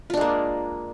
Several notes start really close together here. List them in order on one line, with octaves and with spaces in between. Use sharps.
F4 D4 G#3 A#3